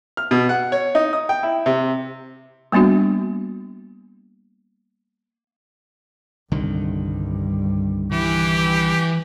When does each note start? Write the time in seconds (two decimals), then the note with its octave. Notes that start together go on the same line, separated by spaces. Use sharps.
0.17 F6
0.31 B2
0.49 F#5
0.72 C#5
0.95 D#4
1.13 D#6
1.29 G5
1.43 E4
1.66 C3
2.72 G3 A#3 B3 D4 F#4
6.52 C2 G2 D3 D#3
8.12 E3 G4